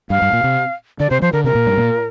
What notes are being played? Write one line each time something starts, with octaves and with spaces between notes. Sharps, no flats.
G2 F5
G2
A#2
C3
D3 D5
C3 C5
F3 C5
D3 A#4
C3 A#4
A#2
G2
A#2